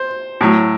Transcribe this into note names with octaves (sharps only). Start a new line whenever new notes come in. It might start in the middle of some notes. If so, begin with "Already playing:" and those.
Already playing: C5
A2 F#3